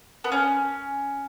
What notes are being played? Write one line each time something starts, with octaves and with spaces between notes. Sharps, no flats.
B3
C#4